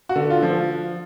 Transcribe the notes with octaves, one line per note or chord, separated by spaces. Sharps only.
F#4
D3
F4
F3